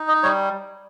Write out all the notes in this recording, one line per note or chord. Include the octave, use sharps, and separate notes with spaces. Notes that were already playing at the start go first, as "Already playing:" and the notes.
Already playing: D#4
D#5
G3 C#5